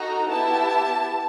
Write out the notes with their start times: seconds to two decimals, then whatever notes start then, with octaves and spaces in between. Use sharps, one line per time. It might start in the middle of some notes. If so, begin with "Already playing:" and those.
Already playing: D#4 F#4 A4 A#5
0.29 B3 E4 G4 A5